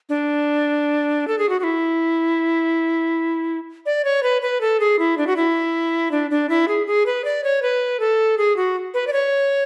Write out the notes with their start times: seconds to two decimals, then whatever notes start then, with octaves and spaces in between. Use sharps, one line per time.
0.09 D4
1.28 A4
1.39 G#4
1.49 F#4
1.60 F#4
1.64 E4
3.86 D5
4.05 C#5
4.23 B4
4.42 B4
4.61 A4
4.80 G#4
4.99 E4
5.18 D4
5.27 F#4
5.36 E4
6.11 D4
6.31 D4
6.49 E4
6.68 G#4
6.87 G#4
7.06 B4
7.25 D5
7.44 C#5
7.62 B4
8.00 A4
8.38 G#4
8.56 F#4
8.94 B4
9.07 D5
9.13 C#5